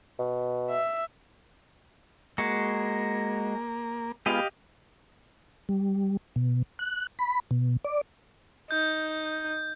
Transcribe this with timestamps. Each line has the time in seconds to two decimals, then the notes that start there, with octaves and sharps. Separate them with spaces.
0.19 B2
0.71 E5
2.38 G#3 A#3 F#4
4.26 G#3 B3 F4 G4 D#5 F5
5.69 G3
6.36 B2
6.79 F#6
7.19 B5
7.51 B2
7.85 D5
8.71 D#4 G6